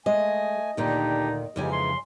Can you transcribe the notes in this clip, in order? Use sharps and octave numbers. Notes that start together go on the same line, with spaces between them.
G#3 A3 D#5 G#5
D2 A#2 D#3 D4 D#4 G4
F2 C#3 E3 G#3 D#4 G4 G#5
C6